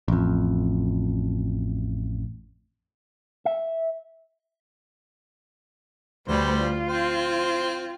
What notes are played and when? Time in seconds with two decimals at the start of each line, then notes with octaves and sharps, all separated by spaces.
0.08 A1 F2
3.45 E5
6.28 D2 G3 D4 B4 C5
6.59 F4
6.89 C4 C5 G5